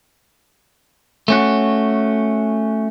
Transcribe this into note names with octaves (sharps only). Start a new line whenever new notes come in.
A3 C#4 F#4